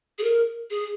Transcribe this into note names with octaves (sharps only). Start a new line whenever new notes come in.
G#4
A#4
G#4